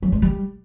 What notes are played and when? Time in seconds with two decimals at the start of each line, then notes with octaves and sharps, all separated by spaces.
0.02 F#3
0.12 G#3
0.22 G3